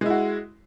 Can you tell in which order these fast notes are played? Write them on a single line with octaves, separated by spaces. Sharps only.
G#3 E4 F#4